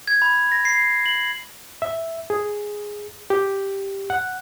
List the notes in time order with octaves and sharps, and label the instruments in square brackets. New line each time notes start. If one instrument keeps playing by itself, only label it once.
[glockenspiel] G#6
B5
A#6
C7
F#7
[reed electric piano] E5
G#4
G4
F#5